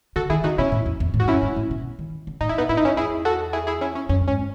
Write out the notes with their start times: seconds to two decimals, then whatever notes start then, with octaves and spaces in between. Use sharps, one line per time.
0.16 C#3 F#4 A4
0.30 D#3 E4 G#4
0.44 C#3 D#4 F#4
0.58 B2 C#4 E4
0.72 A2
0.86 E2
1.00 E2
1.14 A2
1.20 G#2 F#4
1.28 F#2 C#4 E4
1.43 G#2
1.56 A2
1.71 B2
1.99 D#3
2.27 C#3
2.41 A2 D#4
2.49 E4
2.55 B2 B3 D#4
2.69 A2 E4
2.77 D#4
2.83 G#2 C#4 E4
2.97 E2 E4 G#4
3.25 F#4 A4
3.53 E4 G#4
3.67 E4 G#4
3.81 C#4 E4
3.95 C#4
4.09 F#2 C#4
4.28 G#2 C#4